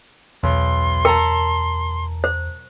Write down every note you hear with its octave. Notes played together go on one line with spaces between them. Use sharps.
B1 E2 C6
A#4 A5 A#5 C#7
C5